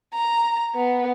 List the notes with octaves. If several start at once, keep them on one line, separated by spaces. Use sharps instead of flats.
A#5
B3